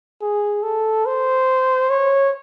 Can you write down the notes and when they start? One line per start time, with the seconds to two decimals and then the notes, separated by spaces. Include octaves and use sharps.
0.22 G#4
0.63 A4
1.06 C5
1.90 C#5